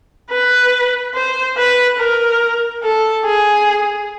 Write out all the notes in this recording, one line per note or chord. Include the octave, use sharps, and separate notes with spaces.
B4
C5
B4
A#4
A4
G#4